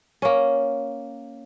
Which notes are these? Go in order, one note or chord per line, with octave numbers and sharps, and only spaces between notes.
A#3 C#4